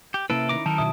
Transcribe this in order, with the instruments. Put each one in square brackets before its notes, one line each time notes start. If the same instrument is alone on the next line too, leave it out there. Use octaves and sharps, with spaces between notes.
[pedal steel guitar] G4
[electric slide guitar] C3 A#3 B4 [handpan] C#4 E4 [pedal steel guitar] A4 [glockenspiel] D7
[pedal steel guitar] D#3 A#5 D6
[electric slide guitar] D#3 [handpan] F#3 [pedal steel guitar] D#4 A4 A#4 [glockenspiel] A5
[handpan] B2 D#3 E5 [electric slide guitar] F#3 [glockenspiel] D#6